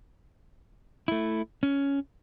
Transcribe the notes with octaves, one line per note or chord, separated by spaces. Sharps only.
A3 E4
C#4